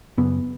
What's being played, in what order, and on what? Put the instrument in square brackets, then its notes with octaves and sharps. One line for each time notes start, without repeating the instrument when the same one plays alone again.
[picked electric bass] F#2 C#3 B3